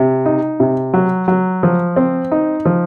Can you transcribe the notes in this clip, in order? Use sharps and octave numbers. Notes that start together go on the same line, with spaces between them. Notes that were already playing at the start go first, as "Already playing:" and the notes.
Already playing: C3
D#4
C3
F#3
F#3
F3
C4
D#4
F3